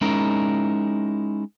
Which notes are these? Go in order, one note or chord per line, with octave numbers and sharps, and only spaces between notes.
G#3 C#4 D#4 E4 A#4